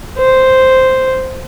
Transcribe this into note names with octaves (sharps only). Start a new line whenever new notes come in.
C5